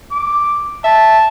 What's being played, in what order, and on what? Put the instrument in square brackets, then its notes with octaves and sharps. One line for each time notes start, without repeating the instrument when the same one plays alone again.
[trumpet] D6
[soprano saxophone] E5 [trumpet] A5